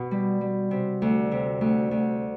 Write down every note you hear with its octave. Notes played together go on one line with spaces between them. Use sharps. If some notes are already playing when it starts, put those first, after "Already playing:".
Already playing: B2
G3
G3
C3
D2
C3
D2
D2